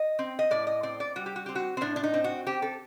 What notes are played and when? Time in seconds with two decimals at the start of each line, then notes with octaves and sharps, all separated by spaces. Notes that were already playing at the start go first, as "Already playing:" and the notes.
Already playing: D#5
0.19 C4
0.39 D#5
0.51 A2 D5
0.67 D#5
0.83 C4 D5
1.00 D5
1.16 G3 F#4
1.26 G4
1.36 F#4
1.46 C4 G4
1.55 F#4
1.77 C4
1.81 A2 D4
1.96 D4
2.03 D#4
2.14 C4
2.24 F#4
2.47 C4 G4
2.62 A4